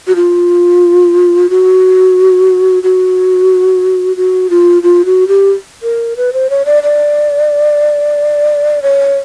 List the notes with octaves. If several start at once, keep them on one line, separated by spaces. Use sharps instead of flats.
F#4
F4
F#4
F#4
F#4
F4
F4
F#4
G4
A#4
B4
C5
C#5
D5
D5
C#5